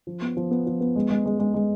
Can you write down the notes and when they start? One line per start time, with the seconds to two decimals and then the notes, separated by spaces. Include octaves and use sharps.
0.07 F3
0.22 B3
0.37 F3
0.51 B3
0.67 F3
0.81 B3
0.96 G#3
1.10 G#3
1.26 G#3
1.40 G#3
1.54 G#3